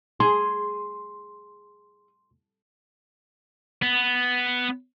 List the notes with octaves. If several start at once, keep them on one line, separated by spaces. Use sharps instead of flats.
G#4 C6
B3